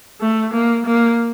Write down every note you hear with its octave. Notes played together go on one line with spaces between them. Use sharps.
A3
A#3
A#3